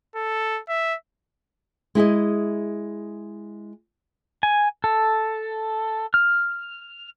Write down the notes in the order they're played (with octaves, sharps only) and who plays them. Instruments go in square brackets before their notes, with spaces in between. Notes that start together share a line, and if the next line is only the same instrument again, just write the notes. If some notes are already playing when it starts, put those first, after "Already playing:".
[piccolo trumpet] A4
E5
[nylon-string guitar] G#3 E4 G#4 D#5
[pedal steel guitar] G#5
A4
F6